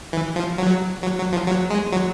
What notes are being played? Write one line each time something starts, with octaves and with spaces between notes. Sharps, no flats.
E3
F3
F#3
F#3
F#3
F3
F#3
G#3
F#3